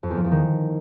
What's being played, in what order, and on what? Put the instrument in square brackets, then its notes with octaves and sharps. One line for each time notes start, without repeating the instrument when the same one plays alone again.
[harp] F2
E2
F3
E2
D#3